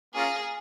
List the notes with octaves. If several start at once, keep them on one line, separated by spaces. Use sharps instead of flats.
A#3 C#4 F4 G#4 A#4 F5